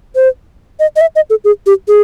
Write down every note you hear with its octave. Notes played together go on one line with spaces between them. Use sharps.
C5
D#5
D#5
E5
D#5
A4
G#4
G4
G#4